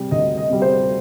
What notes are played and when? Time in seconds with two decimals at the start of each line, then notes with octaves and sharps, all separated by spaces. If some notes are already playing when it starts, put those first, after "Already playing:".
Already playing: C3 G3
0.11 D2 D#5
0.37 D#5
0.49 C3 G3
0.62 C5